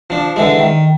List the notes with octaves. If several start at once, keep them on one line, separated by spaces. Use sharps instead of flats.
F3 D4
D3 E3 G#3
D#3